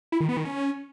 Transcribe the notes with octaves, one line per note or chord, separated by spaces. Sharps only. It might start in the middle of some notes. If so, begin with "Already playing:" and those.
E4
D#3
B3
D#3
C#4